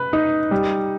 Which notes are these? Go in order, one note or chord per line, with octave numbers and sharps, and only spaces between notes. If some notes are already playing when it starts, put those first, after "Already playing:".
Already playing: B4
D#4
G3